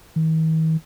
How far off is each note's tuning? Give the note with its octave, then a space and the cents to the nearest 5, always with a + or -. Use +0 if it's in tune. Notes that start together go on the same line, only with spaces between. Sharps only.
D#3 +45